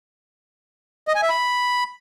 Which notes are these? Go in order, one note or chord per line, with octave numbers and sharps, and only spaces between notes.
D#5
G#5
E5
B5